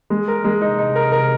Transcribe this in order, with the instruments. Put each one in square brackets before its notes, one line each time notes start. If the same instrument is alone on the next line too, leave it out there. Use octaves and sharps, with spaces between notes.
[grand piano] G#3
A#4
G#3
[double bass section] C3 [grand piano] D#4
[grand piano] D#4
A#4
A#4